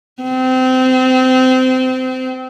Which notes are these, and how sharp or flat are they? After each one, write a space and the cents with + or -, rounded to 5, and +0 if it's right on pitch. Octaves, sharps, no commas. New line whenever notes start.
C4 -25